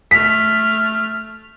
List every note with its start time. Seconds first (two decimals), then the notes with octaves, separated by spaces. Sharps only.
0.11 A3 F6 B6